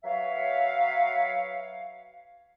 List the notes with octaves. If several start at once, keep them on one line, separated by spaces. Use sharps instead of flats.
F#3 B4 C#5 E5 F5